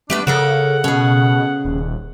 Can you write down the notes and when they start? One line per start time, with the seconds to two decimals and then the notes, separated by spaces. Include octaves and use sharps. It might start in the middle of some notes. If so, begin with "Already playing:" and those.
0.10 G3 A3 B3 D4 B4
0.27 C#3 A4 A#4 C#5 F#5
0.84 B2 C#4 G#4
1.65 D#1